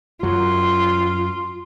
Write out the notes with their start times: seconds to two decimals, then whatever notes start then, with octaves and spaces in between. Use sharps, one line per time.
0.23 F#2 F#3 F4